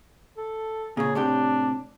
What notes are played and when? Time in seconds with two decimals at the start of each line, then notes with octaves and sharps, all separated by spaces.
0.37 A4
0.97 A#2 C#3 G#4
1.15 A2 C3 D4 G4